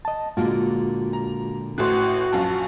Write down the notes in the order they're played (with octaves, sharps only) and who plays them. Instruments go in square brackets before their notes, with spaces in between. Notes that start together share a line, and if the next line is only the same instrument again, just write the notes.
[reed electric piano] D#5 A5
[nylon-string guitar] A#2 D3 A#3 [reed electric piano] G#3 F4 F#4
[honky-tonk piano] A#5
[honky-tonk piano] A1 A2 [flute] F#4 [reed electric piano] C6 F#6
[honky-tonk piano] A#1 F#2 F5 [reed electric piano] A5